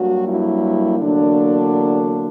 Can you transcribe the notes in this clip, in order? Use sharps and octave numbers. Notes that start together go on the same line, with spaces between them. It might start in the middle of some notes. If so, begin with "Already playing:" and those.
Already playing: G2 F#3 A#3 F#4
E4
E2 D3 F#3 A#3 D4